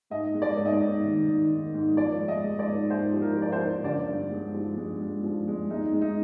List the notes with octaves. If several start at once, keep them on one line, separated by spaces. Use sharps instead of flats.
G#2 D#5
G#3
D5
G#2
D#5
D5
G#2
D#3
D#3
D#3
G#2
F3 D5
G#3
D#5
G#3
D5
G#2
G#2 C5
F3
A#4
F3
D5
C5
F3
D3 D5
G2
G#3
F3
G#3
G#3
F3
G#3
G#3 D#4
G#3
D#4